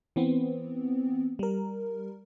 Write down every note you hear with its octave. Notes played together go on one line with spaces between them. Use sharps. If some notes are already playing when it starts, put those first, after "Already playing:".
E3 B3 C4
G3 A#4